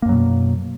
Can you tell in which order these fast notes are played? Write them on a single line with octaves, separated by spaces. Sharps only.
A#3 F#2 F#3 B2